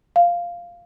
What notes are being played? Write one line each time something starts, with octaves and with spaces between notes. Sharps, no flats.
F5